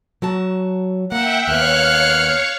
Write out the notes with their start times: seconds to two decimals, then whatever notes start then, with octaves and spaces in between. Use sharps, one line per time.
0.22 F#3 F#4 A5
1.12 A#3 E5 F#5 G5
1.48 D#2 B3 C#5 F5 C#6 F6 F#6